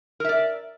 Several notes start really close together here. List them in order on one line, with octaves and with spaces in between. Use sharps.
A#4 E5 D5